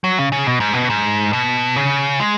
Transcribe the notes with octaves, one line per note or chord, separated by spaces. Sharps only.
F#3
C#3
C#3
B2
G#2
B2
G#2
B2
C#3
G#3